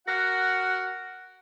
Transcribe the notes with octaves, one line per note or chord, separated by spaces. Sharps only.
F#4 A#4 F#5